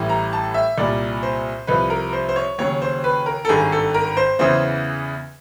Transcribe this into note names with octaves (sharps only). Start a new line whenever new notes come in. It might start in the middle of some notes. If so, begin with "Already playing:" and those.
Already playing: A1 A2 E3 G3
A#5
A5
E5
C2 A#2 G3 D5
C5
C2 C3 F3 B4
A#4
C5
C5
C#5
D#2 C#3 F#3 C#5
C5
B4
A#4
A4
G#1 G2 D#3 G#4
A4
A#4
C5
E2 C#3 E3 C5